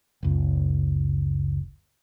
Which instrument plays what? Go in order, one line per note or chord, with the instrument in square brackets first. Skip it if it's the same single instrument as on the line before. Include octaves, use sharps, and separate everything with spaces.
[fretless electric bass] F#1 C#2